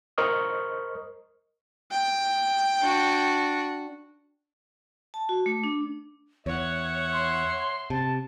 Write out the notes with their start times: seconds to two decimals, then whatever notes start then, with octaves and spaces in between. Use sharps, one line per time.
0.18 A#4 C5 D#5 C#6 D#6 F6
1.91 G5
2.80 D4 F#4
5.14 A5
5.29 F#4
5.46 A3
5.64 D4
6.46 E2 C#5 E5 F#5
7.13 C6
7.90 C3 A5